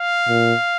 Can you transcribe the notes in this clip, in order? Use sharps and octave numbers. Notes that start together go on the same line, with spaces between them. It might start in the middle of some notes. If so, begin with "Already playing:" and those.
Already playing: F5
A#2